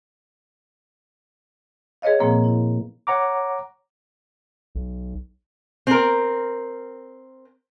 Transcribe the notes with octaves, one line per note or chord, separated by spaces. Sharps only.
G#4 B4 C#5 D#5 F5
A#2 F3 A#3 C4 G#4
E4
C#5 F#5 A#5 D6
B1
C4 A#4